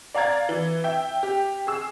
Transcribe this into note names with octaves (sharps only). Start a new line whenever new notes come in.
D5 F5 A#5 G#6 A6
E3
E5 G5
G4
G#4 E6